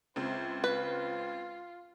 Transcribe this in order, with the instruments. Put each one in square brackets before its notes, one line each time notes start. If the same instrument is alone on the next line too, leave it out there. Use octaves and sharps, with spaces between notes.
[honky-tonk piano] C#2 C4 [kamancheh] C5 E5
[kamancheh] F4 [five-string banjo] B4